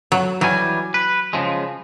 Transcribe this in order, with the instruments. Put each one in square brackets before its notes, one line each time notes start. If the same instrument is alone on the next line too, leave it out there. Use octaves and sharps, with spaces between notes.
[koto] F#3
[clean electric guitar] E3 G3 G#5 [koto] F#3
[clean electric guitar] B4
C#3 F3 G#3